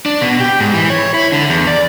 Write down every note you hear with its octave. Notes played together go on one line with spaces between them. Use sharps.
D4
B2
G4
G#2
E3
C#5
E4
D3
E2
D5